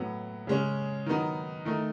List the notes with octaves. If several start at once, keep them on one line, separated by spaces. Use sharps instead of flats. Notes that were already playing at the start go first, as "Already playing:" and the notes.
Already playing: A2 F#3 B3
C#3 G#3 C#4
D#3 F#3 B3 D#4
D#3 A3 D#4